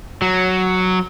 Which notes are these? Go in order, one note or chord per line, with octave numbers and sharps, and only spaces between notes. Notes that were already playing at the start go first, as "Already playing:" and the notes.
F#3